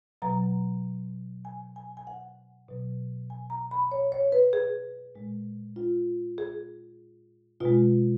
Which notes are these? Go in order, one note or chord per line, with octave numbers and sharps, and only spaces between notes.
B2 F#3 A#5
G#5
G#5
G#5
F#5
B2 F#3
G#5
A#5
B5
C#5
C#5
B4
G#4
A#2 G#3
F4
G#4
B2 G#3 F4